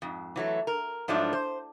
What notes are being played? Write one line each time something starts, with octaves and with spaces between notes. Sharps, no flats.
F2 G#2
E3 F#3 A3
A#4
G#2 F3 F#3 A3 D4 E4
C5